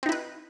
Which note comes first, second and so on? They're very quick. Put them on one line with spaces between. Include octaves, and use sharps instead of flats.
C4 D#4 E4 B4